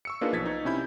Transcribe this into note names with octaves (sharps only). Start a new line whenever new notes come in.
C#6 E6 C#7
A#3 D4 D#4 F4 G#4 B4
B1 F3 G#6 A6 B6
D#4
C3 C#4 E4 B5 G6